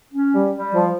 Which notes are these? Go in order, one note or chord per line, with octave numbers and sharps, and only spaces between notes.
C#4
G3
G3
F3